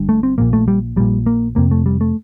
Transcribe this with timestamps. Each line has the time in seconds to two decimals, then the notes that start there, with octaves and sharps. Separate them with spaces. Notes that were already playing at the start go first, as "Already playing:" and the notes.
Already playing: G1 G2
0.09 A3
0.23 C4
0.38 A#1 A#2 A#3
0.53 A3
0.68 G3
0.96 A#1 A#2 G3
1.26 A#3
1.55 F1 F2 C3 A#3
1.71 A3
1.86 G3
2.01 A3